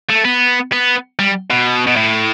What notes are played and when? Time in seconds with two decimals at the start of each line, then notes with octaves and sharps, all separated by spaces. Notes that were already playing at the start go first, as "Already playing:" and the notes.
0.09 A3
0.25 B3
0.72 B3
1.19 G3
1.50 B2
1.87 B2
1.96 A2